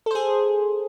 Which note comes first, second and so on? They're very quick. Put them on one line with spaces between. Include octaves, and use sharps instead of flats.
A4 C5 G#4